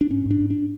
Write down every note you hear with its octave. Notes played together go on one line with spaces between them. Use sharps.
D4
G#2 C#4
G#2
D4
G#2
D4